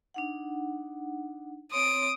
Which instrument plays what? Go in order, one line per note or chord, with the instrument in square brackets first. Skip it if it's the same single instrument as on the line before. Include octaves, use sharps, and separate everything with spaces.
[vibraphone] D4 D#4 F#5
[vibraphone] C4 C#5 C6 [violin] D#6 D7